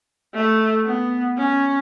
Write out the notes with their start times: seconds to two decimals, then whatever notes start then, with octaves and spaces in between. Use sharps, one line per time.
0.34 A3
0.86 B3
1.38 C#4